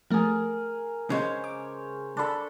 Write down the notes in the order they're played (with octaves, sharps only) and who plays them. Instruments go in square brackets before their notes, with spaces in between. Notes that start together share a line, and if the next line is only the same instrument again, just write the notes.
[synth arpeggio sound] F3 A3 [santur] G#4 A#4
[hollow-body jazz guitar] C#3 G#3 [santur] C5 C#5
[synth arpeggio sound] D6
[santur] D4 A4 [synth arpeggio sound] A5 B5